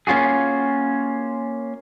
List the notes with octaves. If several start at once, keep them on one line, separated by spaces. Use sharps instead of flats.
A#3 C#4 F4 F#4 G#4